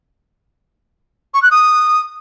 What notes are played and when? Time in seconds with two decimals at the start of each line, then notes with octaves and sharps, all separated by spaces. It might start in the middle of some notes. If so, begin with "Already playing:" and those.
1.34 C#6
1.43 F#6
1.51 D#6